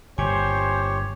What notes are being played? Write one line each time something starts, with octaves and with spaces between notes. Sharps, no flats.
G1 A#2 G4 C5 C#5 G#5